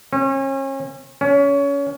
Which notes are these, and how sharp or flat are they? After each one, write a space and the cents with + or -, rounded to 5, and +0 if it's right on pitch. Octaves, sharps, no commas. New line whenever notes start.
C#4 -35
C#4 +25